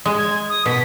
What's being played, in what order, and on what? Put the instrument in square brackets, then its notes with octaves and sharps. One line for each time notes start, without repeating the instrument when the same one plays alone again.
[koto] G#3
[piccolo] G#6
D#6
[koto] B2 [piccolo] B6